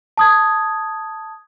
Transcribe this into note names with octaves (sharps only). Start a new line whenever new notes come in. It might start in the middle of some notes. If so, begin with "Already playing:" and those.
A5 D#6 G#6